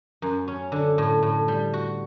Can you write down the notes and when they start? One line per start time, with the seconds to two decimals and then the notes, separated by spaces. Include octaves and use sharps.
0.22 F#2
0.48 C#4
0.72 D3
0.98 A2
1.23 A2
1.48 G3
1.73 F#4